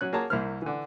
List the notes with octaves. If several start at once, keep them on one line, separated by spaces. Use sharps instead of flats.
F#3 C#4 F#6
A#3 F#4 G#4 C#5 A5 A#5
C2 A#3 E4 C5 F6
D3 E3